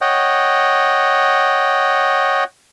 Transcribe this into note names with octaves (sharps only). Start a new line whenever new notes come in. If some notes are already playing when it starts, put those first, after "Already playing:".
C#5 D#5 F#5 G5